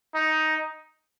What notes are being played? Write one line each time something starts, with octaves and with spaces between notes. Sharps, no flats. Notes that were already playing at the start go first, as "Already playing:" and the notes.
D#4